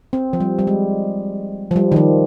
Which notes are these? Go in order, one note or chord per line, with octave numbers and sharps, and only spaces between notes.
C4
F3
G3
G3
G#3
F3
G3
D#3
F3